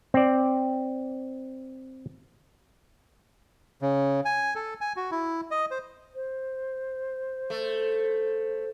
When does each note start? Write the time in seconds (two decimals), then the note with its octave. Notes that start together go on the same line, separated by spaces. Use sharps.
0.14 C4 D5
3.82 C#3
4.25 G#5
4.55 A4
4.81 G#5
4.96 F#4
5.11 E4
5.51 D#5
5.71 C5
6.15 C5
7.50 A3